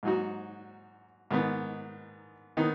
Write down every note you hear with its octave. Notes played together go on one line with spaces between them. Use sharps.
G#2 F#3 D#4 F#4
G#2 D#3 B3
D#3 B3 D#4